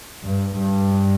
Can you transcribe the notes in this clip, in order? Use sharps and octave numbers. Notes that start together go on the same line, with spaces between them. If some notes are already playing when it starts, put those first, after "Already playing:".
G2
G2